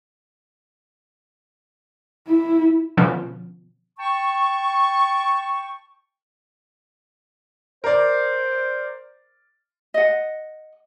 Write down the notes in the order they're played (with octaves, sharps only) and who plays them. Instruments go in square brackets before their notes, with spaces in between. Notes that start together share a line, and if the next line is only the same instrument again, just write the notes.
[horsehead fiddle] E4
[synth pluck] B2 D3 F3 B3 C#4
[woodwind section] G5 A5 C#6
[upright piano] A#4 D5 [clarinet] C5
[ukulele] D#5 F#5